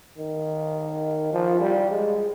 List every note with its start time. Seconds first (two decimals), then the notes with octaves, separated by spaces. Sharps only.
0.18 D#3
1.33 F3
1.60 G3
1.90 G#3